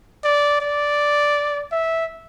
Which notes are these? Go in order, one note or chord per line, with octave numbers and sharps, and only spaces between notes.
D5
D5
E5